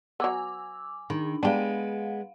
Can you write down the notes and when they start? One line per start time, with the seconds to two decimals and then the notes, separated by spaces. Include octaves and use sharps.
0.20 F#3 B3 G#5 D6 E6
1.10 D#3 D4
1.43 G#3 B3 D4 G4 F5 F#5